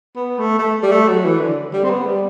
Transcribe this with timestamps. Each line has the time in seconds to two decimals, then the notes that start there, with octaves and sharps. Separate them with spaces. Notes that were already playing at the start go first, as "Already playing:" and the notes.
0.16 B3
0.38 A3
0.59 A3
0.83 G3
0.92 A3
1.08 F#3
1.25 E3
1.40 D3
1.73 G3
1.84 C4
1.90 B3
2.06 G3